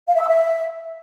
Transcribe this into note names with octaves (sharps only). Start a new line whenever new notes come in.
F5
E5
E6
E5